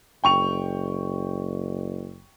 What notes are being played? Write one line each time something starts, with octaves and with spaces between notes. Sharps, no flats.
F#1 G5 C#6 F7